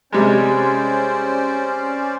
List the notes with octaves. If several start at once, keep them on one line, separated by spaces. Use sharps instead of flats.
C3 G3 G#3 C#4 C5 D5